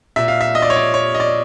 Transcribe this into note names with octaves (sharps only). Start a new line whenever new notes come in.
A#2 E5
F5
E5
D#5
D5
C#5
D5
C#5
D#5
D5